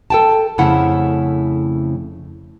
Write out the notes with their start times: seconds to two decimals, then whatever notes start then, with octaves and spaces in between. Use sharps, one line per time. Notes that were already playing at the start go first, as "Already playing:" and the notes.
0.10 A4 G5 A5
0.58 F2 C#3 A3 E4 F#5